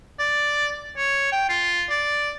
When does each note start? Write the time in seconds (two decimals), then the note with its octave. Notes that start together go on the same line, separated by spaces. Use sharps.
0.19 D5
0.97 C#5
1.32 G5
1.49 F4
1.89 D5